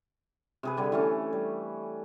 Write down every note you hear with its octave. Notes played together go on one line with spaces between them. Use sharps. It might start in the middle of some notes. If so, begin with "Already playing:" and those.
C3 G#4 B4
D3 G3 D4
E3 A3 C#4
G3